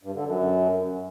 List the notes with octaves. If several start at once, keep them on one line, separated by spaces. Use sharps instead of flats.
G2
D3
F#2